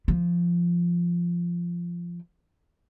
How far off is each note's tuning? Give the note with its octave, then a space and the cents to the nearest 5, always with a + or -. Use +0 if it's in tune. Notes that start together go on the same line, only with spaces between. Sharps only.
F3 -10